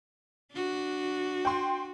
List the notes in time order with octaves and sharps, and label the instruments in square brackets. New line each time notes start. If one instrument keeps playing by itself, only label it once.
[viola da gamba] D4 F#4
[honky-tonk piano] G5 C6